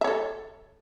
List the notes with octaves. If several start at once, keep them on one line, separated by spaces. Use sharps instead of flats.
A4 C#5 E5